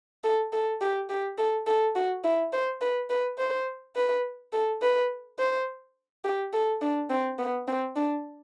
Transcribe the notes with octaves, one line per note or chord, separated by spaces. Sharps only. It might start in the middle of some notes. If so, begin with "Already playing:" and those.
A4
A4
G4
G4
A4
A4
F#4
E4
C5
B4
B4
C5
B4
A4
B4
C5
G4
A4
D4
C4
B3
C4
D4